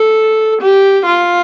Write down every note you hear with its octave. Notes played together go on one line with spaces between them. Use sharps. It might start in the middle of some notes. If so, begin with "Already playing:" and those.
Already playing: A4
G4
F4